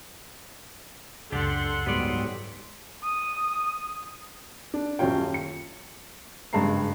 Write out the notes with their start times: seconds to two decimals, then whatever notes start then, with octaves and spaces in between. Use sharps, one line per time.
1.32 C#2 F#2 D4 G4 A4 F#5 C6
1.86 G#2 F#3 G3 B3 D5
3.03 D#6
4.74 D4
4.99 D#1 F#2 C#4 F4 G5
5.34 C#7
6.53 F#1 G2 G#3 A5 A#5 C7